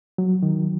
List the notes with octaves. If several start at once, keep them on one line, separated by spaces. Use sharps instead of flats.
F#3
D#3